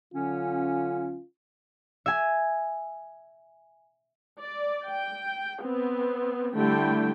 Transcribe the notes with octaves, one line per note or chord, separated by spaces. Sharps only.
D3 F#3 C#4 F4
E5 G#5
D5
G5
B3 C4
D3 G3 A3 E4 G5